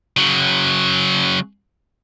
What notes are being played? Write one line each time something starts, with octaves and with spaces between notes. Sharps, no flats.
C#3 F#3